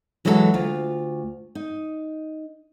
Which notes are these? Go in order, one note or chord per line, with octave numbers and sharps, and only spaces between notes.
E3 F#3 G#3 F#4 G4 A4
D2 F4
D#4